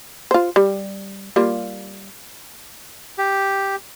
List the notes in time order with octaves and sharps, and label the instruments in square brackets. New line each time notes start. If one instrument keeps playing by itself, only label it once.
[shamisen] F4 C5
G3
G3 A#3 F4
[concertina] G4